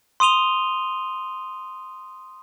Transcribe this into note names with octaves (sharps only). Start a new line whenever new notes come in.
C6 D#6 D#7 F7 G7